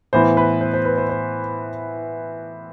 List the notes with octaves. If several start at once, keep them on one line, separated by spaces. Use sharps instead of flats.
A2 E3 B3 E4 C5
B4
C5
C5
B4
C5
C5